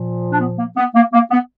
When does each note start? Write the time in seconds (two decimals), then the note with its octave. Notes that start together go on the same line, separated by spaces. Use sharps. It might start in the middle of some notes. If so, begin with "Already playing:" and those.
Already playing: A#2 F3
0.32 D4
0.40 B3
0.58 A#3
0.77 B3
0.95 A#3
1.13 A#3
1.31 B3